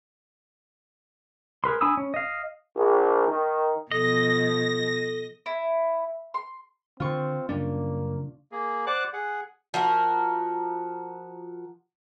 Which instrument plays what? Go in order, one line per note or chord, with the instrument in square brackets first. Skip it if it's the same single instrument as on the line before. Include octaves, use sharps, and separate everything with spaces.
[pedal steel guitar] G#4 A#4 B4 C6
D4 G#5 B5 D#6 E6
C#4
D#5 F5
[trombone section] A#1
D#3
[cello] B2 F3 [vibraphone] A4 [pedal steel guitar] D#5 [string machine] A#6
[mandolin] E4
C6
[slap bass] D3 D#3 [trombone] C4 [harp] F4 C#6
[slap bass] F#2 G3 C#4 [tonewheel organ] C#3 [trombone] A#3 [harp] D4
[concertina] A#3 G#4
C5 D5 F#5 D6 F#6
G#4 F#5
[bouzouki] F3 F#4 A#4